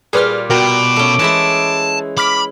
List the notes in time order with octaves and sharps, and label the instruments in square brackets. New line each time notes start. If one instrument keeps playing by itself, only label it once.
[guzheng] A#2 G3 F4 [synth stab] G#4 B4 F6
[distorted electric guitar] B2 [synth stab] F#4 A#4 G5 [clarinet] D6
[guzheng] A3 C#4
[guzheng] E3 G#3 E4 [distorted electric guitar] A5
[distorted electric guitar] B5 [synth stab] D6 F6 B6